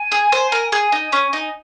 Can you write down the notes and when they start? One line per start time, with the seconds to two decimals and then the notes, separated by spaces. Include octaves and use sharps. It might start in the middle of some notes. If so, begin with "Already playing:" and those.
Already playing: G#5
0.12 G#4
0.32 C5
0.52 A#4
0.72 G#4 G#5
0.92 D#4
1.12 C#4
1.33 D#4